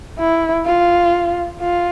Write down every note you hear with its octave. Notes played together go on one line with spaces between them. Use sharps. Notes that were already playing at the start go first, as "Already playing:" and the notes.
E4
F4
F4